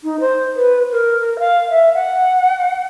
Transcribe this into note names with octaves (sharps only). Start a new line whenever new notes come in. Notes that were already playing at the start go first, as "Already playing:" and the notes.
D#4
C5
B4
A#4
A#4
F5
E5
F#5